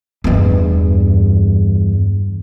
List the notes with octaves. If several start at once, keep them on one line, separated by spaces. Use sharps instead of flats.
E2 G2